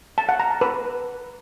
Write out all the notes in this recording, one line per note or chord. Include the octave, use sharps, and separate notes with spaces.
A5
F#5
A#5
A5
B4